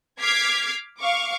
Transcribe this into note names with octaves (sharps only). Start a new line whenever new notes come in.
D6 F6 G#6 B6 C7
F5 C#6 D6